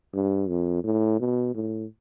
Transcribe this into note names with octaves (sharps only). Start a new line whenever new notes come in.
G2
F2
A2
B2
A2